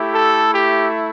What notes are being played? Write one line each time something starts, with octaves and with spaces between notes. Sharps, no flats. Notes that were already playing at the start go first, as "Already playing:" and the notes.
Already playing: A3 E4 G4
A4
G4